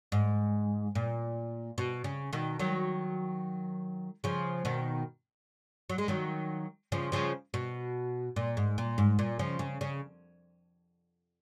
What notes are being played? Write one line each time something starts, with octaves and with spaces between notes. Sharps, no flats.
G#2
A#2
B2
C#3
B2 D#3
D#3 F#3
C#3 F3
B2 D#3
F#3
G#3
D#3 F#3
C#3 F3
C#3 F3
B2
A#2
G#2
A#2
G#2
A#2
C#3 F3
C#3
C#3